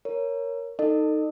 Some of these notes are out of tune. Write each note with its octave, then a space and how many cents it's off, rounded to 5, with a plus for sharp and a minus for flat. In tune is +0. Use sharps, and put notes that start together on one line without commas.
A#4 +0 C#5 +0
D#4 +0 A4 +25 D#5 -40